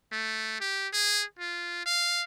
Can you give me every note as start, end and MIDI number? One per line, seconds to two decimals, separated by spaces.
0.12 0.61 57
0.61 0.88 67
0.93 1.23 68
1.39 1.83 65
1.86 2.23 77